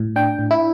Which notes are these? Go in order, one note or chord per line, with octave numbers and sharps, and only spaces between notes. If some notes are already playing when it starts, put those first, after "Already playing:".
Already playing: A2
D4 G5
A2
E4